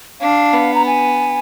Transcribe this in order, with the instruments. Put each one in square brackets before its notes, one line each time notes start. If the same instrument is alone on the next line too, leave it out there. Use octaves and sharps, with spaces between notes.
[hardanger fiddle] D4 [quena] F5
[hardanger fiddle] B3
[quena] A#5
G#5